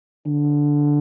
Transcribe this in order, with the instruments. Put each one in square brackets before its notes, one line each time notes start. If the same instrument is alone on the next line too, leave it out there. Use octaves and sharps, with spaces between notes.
[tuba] D3